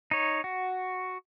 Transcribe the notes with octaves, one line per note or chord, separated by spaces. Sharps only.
D#4 C#5
F#4